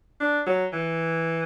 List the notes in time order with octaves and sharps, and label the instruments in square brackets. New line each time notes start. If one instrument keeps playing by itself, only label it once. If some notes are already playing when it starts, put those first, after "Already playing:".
[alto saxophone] D4
F#3
E3